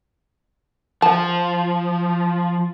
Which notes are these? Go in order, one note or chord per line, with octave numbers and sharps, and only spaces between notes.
F3 A5